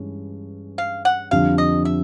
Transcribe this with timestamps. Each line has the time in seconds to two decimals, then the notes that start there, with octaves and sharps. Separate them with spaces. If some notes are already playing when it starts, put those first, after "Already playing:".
Already playing: G2 E3 G#3 C#4
0.78 F5
1.05 F#5
1.31 F2 D3 G3 F5
1.58 D#5
1.85 E5